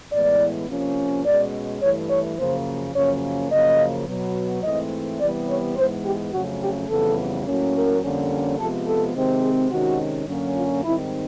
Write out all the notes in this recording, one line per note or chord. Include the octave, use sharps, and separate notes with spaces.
A2 E3 G#3 B3 D5
C3 F3 A#3 C#4
B2 G#3 C#4 D5
G2 E3 A3 C#5
C#5
F#2 C#3 F3 A#3 C#4 C5
F#2 C#3 F3 A#3 C#4 C#5
F#2 C#3 F3 A#3 D#5
B2 F#3 B3
G#2 E3 A3 C4 D#5
C3 E3 G3 B3 D5
C#5
G#2 E3 G#3 B3 C5
G4
F2 C#3 F#3 A3 C#4 F#4
G4
F2 C#3 E3 G3 B3 A4
A2 F#3 A#3 C#4
A#4
F2 D3 G3 A#3 C#4
C3 F3 G#3 B3 A4
A4
C3 D#3 G#3 C4
G#4
C3 D#3 G#3 C#4 F#4
F#2 D3 F#3 A#3 C#4
F4
G#2 D#3 G3 C4 E4